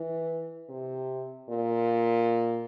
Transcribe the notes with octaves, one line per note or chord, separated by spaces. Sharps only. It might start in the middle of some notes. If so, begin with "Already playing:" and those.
Already playing: E3
C3
A#2